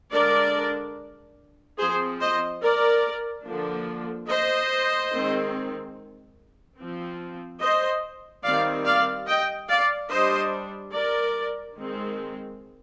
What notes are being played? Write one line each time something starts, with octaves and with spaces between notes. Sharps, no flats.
D3 G#3 D4 A#4 D5
F3 C4 G#4 C5
C5 D#5
A#4 D5
D3 F3 A#3 D4
C5 D#5
D#3 G#3 C4
F3 C4
C5 D#5
D#3 G3 C4 D5 F5
D5 F5
D#5 G5
D5 F5
G3 D4 C5 D#5
A#4 D5
D#3 G#3 C4